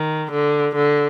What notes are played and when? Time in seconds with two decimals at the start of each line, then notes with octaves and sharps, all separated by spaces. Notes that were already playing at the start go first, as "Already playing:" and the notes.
Already playing: D#3
0.31 D3
0.75 D3